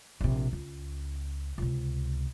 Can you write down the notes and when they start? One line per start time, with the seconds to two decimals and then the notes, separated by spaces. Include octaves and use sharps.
0.21 A#1 C3
0.53 C#2
1.58 C#2 C3